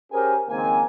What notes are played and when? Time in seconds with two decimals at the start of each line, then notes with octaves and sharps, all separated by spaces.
0.12 C#4 G4 G#4 A#4 C5 G#5
0.49 C#2 D#3 A#3 C4 G#5